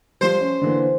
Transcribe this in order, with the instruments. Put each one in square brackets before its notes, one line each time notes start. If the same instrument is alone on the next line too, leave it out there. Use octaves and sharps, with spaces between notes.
[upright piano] F3 G3 [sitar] C5
[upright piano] C#4
D3 E3 A#3